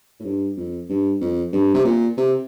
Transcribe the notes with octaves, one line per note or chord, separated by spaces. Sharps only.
A2
G2
F2
G2
F2
G2
C3
A#2
C3